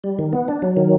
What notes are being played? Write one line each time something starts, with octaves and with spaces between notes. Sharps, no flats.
G3
D#3
B3
D4
F#3
D#3